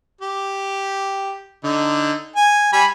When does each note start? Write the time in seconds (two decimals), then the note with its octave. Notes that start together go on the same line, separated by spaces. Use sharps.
0.21 G4
1.64 D3 D#4
2.36 G#5
2.73 G3 G#5 B5